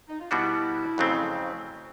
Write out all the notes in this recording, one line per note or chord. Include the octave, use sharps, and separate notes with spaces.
D#4
F4
B2 G3 B3 D4 E4 F#4
F2 C#3 F#3 A3 C4